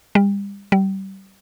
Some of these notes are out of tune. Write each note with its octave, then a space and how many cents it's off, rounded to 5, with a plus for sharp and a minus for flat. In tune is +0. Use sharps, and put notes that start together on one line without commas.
G3 +35
G3 -25